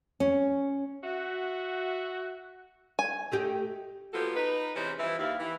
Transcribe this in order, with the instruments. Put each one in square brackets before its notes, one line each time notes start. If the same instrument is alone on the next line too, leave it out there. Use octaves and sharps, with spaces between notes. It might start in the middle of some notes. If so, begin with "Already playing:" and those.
[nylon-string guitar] C#4
[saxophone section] F#4 E5
[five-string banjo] G#5
[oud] A3 D#4 G4
[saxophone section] F3 F#3 A#3 B3 G4 A4
D#4 B4
C3 E3 G#3 C#4 D#4 C5
G2 E3 F3 E4
D#2 E4 F5
E3